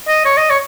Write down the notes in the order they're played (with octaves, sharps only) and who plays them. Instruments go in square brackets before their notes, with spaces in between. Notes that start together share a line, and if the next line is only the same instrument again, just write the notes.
[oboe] D#5
C#5
D#5
C#5